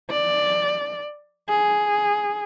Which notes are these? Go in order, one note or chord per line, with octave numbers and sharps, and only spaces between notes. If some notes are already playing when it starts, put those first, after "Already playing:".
D5
G#4